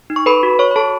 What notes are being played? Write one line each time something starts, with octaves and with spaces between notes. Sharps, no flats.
D#4
C#6
A4 B4 B5
F#4
F#4 C#5 C#6
B5
A4 A5